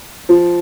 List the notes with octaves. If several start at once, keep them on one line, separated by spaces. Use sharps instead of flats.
F3